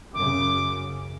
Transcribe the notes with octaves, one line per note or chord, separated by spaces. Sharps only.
F#2 C#3 D6